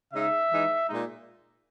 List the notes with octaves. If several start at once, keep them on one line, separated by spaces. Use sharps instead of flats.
C#3 G#3 D#4 E5
E3 G#3 D#4
A#2 G#3 D#4